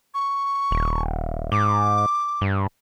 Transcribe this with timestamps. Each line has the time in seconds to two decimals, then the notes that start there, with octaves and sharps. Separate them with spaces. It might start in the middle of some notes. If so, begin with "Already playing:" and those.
0.14 C#6
0.71 D#1
1.52 G#2 D6
2.41 G2